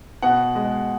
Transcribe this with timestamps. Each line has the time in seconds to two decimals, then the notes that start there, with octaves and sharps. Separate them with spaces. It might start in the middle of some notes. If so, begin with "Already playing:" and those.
0.22 B2 F#5
0.55 G#3